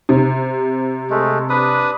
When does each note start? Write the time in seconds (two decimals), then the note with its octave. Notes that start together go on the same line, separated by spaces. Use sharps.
0.09 C3
1.10 G#3 A3
1.50 D4 B4 D#6